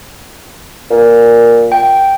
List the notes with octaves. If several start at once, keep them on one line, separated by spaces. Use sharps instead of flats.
A#2
G5